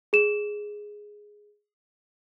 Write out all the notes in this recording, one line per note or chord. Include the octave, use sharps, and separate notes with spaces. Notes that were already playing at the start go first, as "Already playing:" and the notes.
G#4 E7